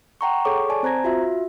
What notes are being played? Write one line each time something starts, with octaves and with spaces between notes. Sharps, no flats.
F#5 G5 A#5 C6 C#6
G#4 A4 C#5 C#6 D6
D5 G#5 A5
C4 C5 A#5 G#6 A#6
F4 F#4 E5